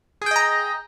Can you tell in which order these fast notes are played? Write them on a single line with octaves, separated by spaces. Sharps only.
G#4 G5 D#5 A#5